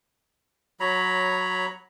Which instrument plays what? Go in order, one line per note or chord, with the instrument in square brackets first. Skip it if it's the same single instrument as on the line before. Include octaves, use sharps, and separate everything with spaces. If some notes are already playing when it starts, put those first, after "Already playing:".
[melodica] F#3 C#5 A#5 B5